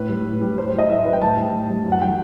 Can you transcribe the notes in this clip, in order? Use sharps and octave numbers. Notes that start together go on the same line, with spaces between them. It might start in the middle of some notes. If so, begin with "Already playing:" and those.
Already playing: A2 B4
G3
A2
G3
A2 C5
C5
F#3 D#5
A2 E5
C5
F#3 B4
G5
A2 A5
G3
A2
G3
F#2
F#5
E3 G3 G5